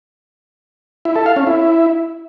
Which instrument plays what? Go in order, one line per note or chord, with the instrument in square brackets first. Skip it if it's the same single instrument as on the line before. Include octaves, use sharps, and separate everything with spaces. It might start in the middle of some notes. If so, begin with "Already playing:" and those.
[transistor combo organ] E4
A4
F5
C#4
E4